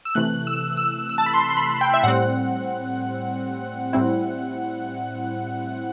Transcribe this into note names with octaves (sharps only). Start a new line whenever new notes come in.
E6
C3 E3 A3 F#6
E6
E6
E6
A5
B5
C6
C6
B5
G5
E5
A2 G3 C4 F#5
A2 G3 C4 E4